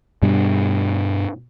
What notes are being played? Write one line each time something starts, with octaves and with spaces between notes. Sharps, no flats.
G2 B2 G3 D4